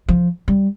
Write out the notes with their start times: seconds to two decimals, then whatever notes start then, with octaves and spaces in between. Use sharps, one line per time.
0.09 F3
0.48 G3